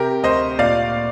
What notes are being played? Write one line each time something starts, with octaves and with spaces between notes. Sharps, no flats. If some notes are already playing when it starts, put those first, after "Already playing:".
Already playing: C3 G4 A#4
D2 C5 D#5
A#2 D5 F5